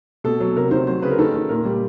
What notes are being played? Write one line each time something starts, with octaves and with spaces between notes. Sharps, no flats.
B2 A4
F#3
C3 A#4
D#3 C5
F#3 C5
C#3 B4
A#4
D#3 A4
D#3
A#2 A#4
G3